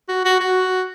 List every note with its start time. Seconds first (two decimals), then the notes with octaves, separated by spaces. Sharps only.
0.09 F#4
0.25 F#4
0.40 F#4